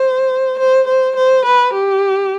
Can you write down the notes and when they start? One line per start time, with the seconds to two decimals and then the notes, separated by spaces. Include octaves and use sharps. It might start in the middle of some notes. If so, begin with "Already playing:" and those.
Already playing: C5
0.59 C5
0.88 C5
1.17 C5
1.45 B4
1.74 G4